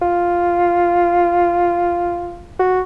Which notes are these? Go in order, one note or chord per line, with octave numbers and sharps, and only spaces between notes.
F4
F#4